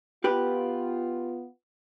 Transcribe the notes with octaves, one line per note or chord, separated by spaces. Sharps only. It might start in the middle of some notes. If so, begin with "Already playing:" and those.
B3 F4 G4 B4